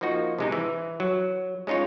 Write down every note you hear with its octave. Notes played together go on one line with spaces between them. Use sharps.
F3 A#3 D#4 F#4
C3 G#3 D#4
E3
F#3
G#3 C#4 D#4 F4 C#5